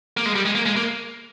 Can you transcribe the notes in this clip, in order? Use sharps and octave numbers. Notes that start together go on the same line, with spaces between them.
A#3
G#3
G3
G#3
A#3
G#3
A#3